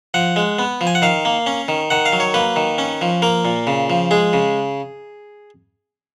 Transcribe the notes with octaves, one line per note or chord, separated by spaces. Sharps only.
F3 F#5
G#3
B3
F3
G#5
F#5
D#3 F5
A#3
C#4
D#3
D#3 F#5
F5
F#3
C#5
A#3 B4
D#3
C#4
F3
A#3 A#4
A#2
C#3
F3
G#3 G#4
C#3